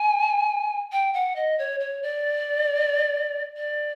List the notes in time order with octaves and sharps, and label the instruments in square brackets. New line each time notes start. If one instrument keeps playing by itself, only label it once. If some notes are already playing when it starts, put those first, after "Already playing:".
Already playing: [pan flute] G#5
G5
F#5
D#5
C#5
C#5
D5
D5